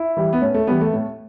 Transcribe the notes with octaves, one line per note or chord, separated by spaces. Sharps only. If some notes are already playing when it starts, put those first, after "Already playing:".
Already playing: E4
E3 G3
B3
A2 C#4
A3
E3 G3 B3
A3
A2